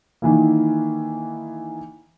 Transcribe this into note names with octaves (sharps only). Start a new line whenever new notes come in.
D#3 E3 A#3